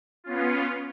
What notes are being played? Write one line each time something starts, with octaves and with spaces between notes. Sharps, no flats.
B3 C#4 F4